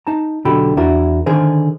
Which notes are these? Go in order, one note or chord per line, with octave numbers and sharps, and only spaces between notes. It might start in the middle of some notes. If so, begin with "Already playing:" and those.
D#4 A5 A#5
B1 D3 F#4 G4 A4 B5
E2 D4 E4 F#4 A#4
D3 D#3 G#4 A#4 C5